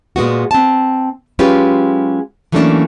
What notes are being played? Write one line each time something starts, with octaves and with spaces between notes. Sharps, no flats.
A#2 G#3 B3 F#4
C4 A5
F#3 G#3 C#4 F4 G4 B4
E3 F#3 A3 A#3 C#4 D4